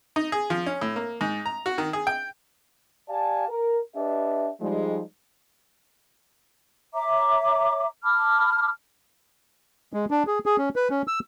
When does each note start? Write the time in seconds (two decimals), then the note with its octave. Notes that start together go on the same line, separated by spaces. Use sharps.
0.16 D#4
0.32 G#4
0.50 F3
0.66 C#4
0.81 A2
0.96 A#3
1.21 G#2
1.46 A#5
1.66 F#4
1.78 D#3
1.93 G#4
2.07 G5
3.09 G4 D5 F5 G#5 A5
3.48 A#4
3.95 D4 G4 B4 D#5 E5
4.60 F3 G3 G#3 D#4
6.94 C#5 E5 A#5 D6
8.04 A5 B5 D6 F6
9.93 G#3
10.11 D4
10.27 G#4
10.46 G#4
10.58 C#4
10.76 B4
10.90 C#4
11.08 E6